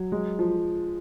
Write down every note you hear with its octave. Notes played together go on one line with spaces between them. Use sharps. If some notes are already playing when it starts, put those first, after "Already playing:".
Already playing: F#3
G#3
F3